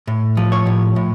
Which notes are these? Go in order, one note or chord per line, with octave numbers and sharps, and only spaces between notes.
A2
F3
C#5
A2
A2